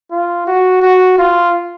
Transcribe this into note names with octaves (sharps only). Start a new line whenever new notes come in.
F4
F#4
F#4
F4